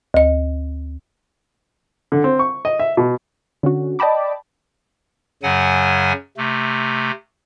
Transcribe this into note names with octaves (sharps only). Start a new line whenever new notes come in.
D2 D#5
D3
C4
C#6
D#5
E5
B2
D3 C#4 F#4
D5 D#5 G5 A5 B5 D6
F#2 C#3 F#3 F#5 G#5
C3 A3